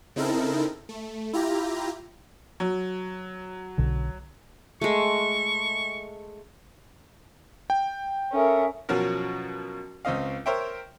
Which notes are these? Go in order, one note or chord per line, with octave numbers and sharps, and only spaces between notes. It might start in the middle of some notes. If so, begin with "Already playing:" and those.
C#3 C4 D#4 E4 A4 A#4
A3
E4 F4 G4 A#5
F#3
B1 B2 D3
G#3 A3 C#6
G5
C#4 A4 A#4 E5 D#6
B2 F3 F#3 C#4 F#4 A#4
C#2 C#3 C4 D#5 F5
A#4 C5 C#5 E5 G5